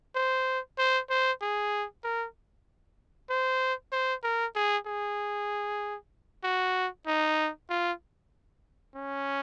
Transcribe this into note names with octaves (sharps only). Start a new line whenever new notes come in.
C5
C5
C5
G#4
A#4
C5
C5
A#4
G#4
G#4
F#4
D#4
F4
C#4